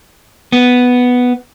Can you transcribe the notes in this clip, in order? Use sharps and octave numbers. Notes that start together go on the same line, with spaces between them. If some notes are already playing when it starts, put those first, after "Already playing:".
B3